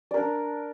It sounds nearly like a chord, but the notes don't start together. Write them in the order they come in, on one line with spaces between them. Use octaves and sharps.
D5 A#4 D4